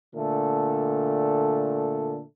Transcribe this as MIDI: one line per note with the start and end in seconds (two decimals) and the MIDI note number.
0.15 2.22 46
0.15 2.22 50
0.15 2.22 57
0.15 2.22 69